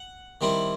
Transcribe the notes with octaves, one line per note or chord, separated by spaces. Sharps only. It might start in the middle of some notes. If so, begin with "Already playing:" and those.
Already playing: F#5
D#3 G3 C4 E4